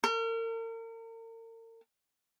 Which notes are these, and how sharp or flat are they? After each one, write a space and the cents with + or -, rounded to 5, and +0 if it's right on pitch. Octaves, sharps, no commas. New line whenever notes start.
A#4 -40